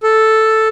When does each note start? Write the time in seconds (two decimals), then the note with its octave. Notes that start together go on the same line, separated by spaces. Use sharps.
0.03 A4